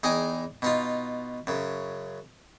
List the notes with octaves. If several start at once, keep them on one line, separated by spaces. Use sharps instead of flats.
E2 D#4 G#4 D#5 G5 G#5
B2 D#4 F4
F#2 C#3